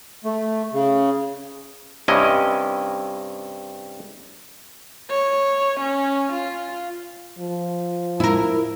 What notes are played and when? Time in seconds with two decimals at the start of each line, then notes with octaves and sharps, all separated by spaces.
0.24 A3
0.73 C#3
2.08 G2 C3 C#4 E4 D#5
5.10 C#5
5.80 C#4
6.33 F4
7.39 F3
8.20 E4 A#4